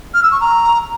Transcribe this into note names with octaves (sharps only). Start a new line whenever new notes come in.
F6
E6
C#6
A#5